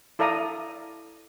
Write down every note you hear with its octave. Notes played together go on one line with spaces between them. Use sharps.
E4 A4 D5 F5 A#5 D#6